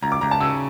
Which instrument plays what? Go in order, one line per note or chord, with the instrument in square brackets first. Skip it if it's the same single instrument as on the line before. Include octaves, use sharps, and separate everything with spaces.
[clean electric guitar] C#2 [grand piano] A#5
[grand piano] D6
[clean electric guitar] C#2 [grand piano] A#5
[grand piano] A5
[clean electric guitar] C#3 [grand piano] E6